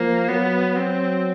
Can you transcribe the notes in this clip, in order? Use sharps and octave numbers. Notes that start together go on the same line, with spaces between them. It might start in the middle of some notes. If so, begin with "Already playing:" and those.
Already playing: F3 A#3
F#3 B3
F#3 C4